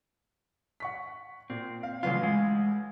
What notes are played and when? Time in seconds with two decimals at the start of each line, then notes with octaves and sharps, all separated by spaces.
0.80 F#5 C#6 B6
1.50 A#2 C4
1.83 F5
2.03 A1 C#3 F#3 F4 B4 F5
2.23 G#3